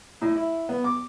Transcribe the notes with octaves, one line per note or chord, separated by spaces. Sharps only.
A2
E4
B3
D6